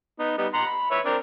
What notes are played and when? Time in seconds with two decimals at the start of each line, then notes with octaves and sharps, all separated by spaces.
0.19 B3 D#4
0.38 G3 B3 D#4
0.53 F#5 A#5 C6
0.66 B5
0.91 B4 C#5 E5
1.05 C4 D4 A#4